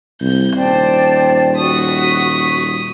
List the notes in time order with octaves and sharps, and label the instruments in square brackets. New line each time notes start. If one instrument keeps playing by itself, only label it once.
[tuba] C2 [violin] G6
[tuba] D#1 [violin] C5 [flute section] D5 G5 A5
[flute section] F#4 C#6 [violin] D#6 B6